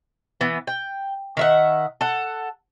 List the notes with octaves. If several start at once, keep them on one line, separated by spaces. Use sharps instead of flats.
E3 B3
G5
D#3 E5 F#5
A4 F#5